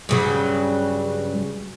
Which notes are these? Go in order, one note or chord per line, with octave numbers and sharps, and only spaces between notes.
G2 C#3 F#3